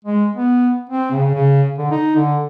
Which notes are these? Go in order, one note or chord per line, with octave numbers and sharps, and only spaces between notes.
G#3
B3
C4
C#3
C#3
D3
D#4
D3